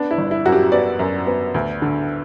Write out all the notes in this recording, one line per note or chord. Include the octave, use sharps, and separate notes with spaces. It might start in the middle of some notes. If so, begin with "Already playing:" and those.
Already playing: B3 D4
E4
G1
E4
F#2 F#4
G4
B3 D5
F#2
B3
D2
D3